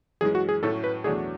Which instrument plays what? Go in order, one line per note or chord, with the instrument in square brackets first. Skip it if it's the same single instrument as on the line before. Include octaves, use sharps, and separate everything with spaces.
[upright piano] F#2 E3 G#3 [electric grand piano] G#4
[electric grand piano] F#4
G#4
[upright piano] A2 F#3 A3 C#4 [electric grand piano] A4
[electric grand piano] B4
[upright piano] E2 B2 F#3 A3 D4 [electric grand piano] G#4